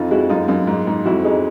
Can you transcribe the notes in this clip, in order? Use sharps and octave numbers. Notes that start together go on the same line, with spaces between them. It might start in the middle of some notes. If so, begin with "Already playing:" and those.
Already playing: F2 D#4 F4
G#3 E4 F#4
F#2 D#4 F4
F#2 D#4 F4
G#2
G#2
F2 E4 F#4
G#3 D#4